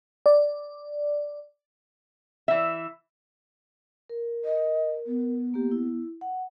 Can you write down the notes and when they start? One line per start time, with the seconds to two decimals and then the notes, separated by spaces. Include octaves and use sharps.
0.26 D5
2.48 E3 E5
4.10 A#4
4.45 D#5
5.07 B3
5.54 A#3 G4
5.71 E4
6.21 F#5